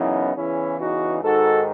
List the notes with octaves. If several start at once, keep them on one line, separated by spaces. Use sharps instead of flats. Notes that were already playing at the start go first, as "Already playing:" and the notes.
Already playing: F#2 C#3 E3 B3 D#4
E2 C#3 E3 C#4 E4
D#4 F#4
G#2 D#3 F#4 A4